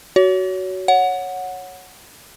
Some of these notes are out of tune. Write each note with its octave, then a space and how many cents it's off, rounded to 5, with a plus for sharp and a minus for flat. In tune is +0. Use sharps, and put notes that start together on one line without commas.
F#4 +15 C#5 +25
C#5 +0 F#5 -10